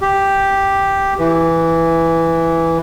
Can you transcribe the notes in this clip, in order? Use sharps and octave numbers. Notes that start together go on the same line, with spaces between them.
G4
E3